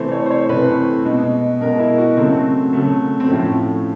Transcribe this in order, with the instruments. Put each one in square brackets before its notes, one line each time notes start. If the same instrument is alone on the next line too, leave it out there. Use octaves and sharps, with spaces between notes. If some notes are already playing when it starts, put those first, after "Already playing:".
Already playing: [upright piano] C3 E3 A3 C5
C#5
C5
C#5
C3 E3 A3 B4
B2 G#3
B2 G#3 A#4
E4
F#4
C#3 F#3 A3 C4
C#3 F#3 A3
C4
A2 F3 A3 C#4